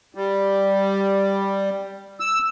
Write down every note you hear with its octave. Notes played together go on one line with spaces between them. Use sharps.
G3
E6